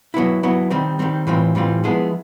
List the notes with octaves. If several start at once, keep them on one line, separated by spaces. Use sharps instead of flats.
F#3 B3 E4
F#3 B3 E4
D#3 G3 C4
D#3 G3 C4
A2 E3 G3 C4 F4
A2 E3 G3 C4 F4
F3 G#3 B3 E4 G#4